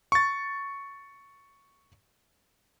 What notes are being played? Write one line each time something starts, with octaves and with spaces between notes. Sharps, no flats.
C#6 A6